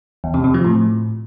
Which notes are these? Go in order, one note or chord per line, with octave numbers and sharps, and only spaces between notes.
E2
C3
C3
F3
A2